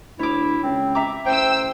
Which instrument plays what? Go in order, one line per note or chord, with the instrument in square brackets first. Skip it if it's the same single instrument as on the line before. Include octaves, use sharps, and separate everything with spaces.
[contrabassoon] D2 [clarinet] E4 [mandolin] C#5 D6
[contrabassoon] C#2 [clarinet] C4
[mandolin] E5 A#5 D6
[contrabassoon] A1 [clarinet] C5 [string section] G5 E6